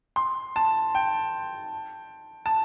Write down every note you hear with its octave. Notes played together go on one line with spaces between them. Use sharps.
C6
A5
G5
A5